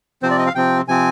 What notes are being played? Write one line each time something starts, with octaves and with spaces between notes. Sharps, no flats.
C3 F3 C4 C5
D5
D#5
F5
C3 F3 C4 G5
C3 F3 C4 G#5